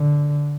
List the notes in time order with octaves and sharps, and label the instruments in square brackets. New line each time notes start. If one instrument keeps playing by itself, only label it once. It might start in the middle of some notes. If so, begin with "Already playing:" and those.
Already playing: [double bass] D3